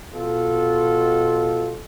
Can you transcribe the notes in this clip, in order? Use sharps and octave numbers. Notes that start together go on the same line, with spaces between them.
B2 F4 A4